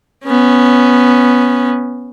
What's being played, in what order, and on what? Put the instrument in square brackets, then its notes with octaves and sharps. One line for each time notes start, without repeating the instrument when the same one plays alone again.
[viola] B3 C#4